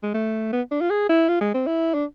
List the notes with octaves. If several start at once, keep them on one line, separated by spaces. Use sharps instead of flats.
G#3
A3
B3
D4
F4
G#4
E4
F4
G#3
C4
E4
D4